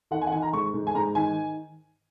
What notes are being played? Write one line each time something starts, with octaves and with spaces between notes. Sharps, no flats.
D#3 F#5
G#5
F#5
D#3 G#5
A#5
G#2 C#6
G#2
G#5
G#2 A#5
D#3 G#5